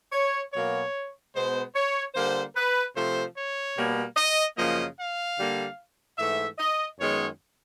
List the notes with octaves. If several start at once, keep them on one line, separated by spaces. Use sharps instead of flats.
C#5
B2 F#3 A#3 C#5
B2 G#3 B3 C5
C#5
D3 G3 A#3 C5
B4
C3 F3 A3 C5
C#5
B2 G3 A#3
D#5
F#2 C#3 F3 A#3 D#5
F5
D3 G3 A#3
G#2 E3 A3 E5
D#5
F#2 D#3 G#3 B3 C#5